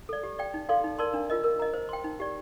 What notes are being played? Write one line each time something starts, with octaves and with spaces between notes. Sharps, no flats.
A4 D5
G4
D5 G5
D#4
A4 D5 F5 C6
D#4
A#4 D5 A5 C6
D4
F4 A#4 D#5
A#4
D#5 A#5
C5
G5 C6
D#4
G4 D5